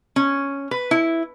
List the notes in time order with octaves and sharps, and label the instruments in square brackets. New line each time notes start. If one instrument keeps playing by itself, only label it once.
[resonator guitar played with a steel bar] C#4
B4
E4